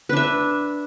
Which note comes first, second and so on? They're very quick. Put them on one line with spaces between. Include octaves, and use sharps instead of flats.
B4 D4 E5